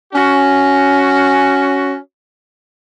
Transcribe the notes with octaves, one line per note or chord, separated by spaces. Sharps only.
C#4 F#4